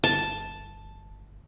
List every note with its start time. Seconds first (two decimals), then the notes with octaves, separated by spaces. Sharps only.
0.04 G1 A5